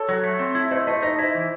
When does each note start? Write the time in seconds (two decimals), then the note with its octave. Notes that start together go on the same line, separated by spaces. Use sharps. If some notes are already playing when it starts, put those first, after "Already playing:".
Already playing: A4 C#5
0.09 F#3
0.24 A3
0.39 C4
0.55 E4
0.71 A3 C5 D#5
0.87 A3 C5 D#5
1.02 D#4 C5 D#5
1.18 E4 C5 D#5
1.35 E3